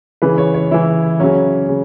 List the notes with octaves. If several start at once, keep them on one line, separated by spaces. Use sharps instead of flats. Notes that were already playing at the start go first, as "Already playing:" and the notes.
C#3 E3 B4
C#5
C#5
C#3 E3 E4
C#3 F#3 C#4
C#3